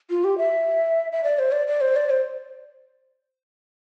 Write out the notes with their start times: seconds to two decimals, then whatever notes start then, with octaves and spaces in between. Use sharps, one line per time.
0.10 F4
0.24 G4
0.38 E5
1.12 E5
1.24 D5
1.39 C5
1.52 D5
1.67 D5
1.81 C5
1.96 D5
2.10 C5